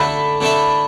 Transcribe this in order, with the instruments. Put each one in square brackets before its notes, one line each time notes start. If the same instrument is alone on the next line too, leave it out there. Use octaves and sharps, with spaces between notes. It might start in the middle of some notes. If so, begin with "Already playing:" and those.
Already playing: [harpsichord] D3 A3 D4 A4 E5 [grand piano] B5
[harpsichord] D3 A3 D4 A4 E5